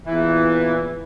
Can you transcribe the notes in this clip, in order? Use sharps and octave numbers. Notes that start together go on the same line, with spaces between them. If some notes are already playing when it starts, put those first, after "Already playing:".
E2 A#2 E3